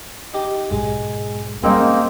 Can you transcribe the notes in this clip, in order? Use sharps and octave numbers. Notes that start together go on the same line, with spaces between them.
D#4 G4
B1 G#2 G#3
G#2 G3 A#3 C4 C#4 D#4